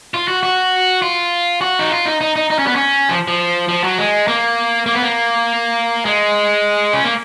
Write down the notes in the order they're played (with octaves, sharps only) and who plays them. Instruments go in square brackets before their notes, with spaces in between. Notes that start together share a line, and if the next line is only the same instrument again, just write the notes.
[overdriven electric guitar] F4
F#4
F#4
F4
F#4
D#4
F4
D#4
D#4
D#4
D#4
C#4
B3
C#4
F3
F3
F3
F#3
G#3
A#3
A#3
B3
A#3
G#3
C#4
A#3